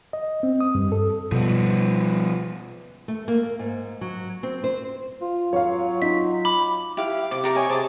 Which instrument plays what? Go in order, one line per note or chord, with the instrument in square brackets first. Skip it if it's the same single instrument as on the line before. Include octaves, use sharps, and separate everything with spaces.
[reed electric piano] D#5
C4
D#6
G2
A4
[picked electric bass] B2 G3 [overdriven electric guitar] F3 B3
[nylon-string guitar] A3
A#3
G#2
F#3
C4
C5
[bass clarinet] F4
[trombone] F#3 [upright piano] C#5 F5
[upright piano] D#4 [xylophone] B6
[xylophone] B5 D6
[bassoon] E4 [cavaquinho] G4 F5
[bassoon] C3 [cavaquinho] D6
[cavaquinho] G4 A#4 D5
[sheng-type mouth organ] C#5 D#5 [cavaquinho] G#5
[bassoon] C3 [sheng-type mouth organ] G#4 A5 [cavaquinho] C6 D6